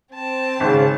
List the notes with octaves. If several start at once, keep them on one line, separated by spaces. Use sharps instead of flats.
C4 A5
G#1 C#3